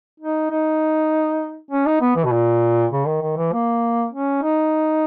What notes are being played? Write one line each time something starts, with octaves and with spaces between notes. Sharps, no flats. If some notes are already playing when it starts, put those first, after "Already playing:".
D#4
D#4
C#4
D#4
B3
E3
B2
A#2
C#3
D#3
D#3
E3
A#3
C#4
D#4